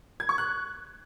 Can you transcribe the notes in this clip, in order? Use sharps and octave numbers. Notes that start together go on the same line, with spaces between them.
G#6
C#6
F#6